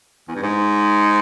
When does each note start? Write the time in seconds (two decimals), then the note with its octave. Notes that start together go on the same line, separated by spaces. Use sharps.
0.28 E2
0.36 G2
0.42 G#2